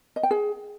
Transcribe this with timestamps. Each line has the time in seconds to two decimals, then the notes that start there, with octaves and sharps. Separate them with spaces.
0.16 D#5
0.23 G5
0.31 G#4